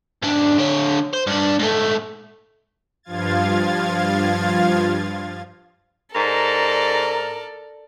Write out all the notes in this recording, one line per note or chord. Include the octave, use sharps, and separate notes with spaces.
G#2 D4
D3 C#5
C5
G2 D4
G#2 A3
G2 F3 F4 F5 G#6 A6
G#2 A4 A#4 D5